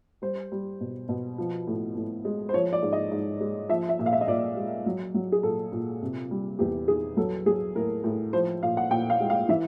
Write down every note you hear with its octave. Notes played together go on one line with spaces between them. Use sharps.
G3 C5
G3
B2
B2
F3
A2
A2
G#3
C5
F3 C#5
D5
G#2
D#5
G#2
G#3
F3 E5
E5
A#2
F5
E5
D#5
A#2 D5
G#3
F#3
F#3
G#4
A#2 A4
A#2
C3
G3
E2 G4
D#3 G#4
F#3 A4
F#3 G#4
A2 A#4
A2
F3 C5
A#2 F5
F#5
A#2 G5
F5
G#3
F5
E3 E5